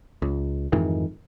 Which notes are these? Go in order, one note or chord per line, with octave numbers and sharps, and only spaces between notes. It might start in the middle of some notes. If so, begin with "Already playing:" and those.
C#2
F2 G#2 D#3 E3